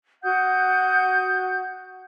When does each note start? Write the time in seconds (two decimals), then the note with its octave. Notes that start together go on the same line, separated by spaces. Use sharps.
0.24 F#4 F#5 D#6 G6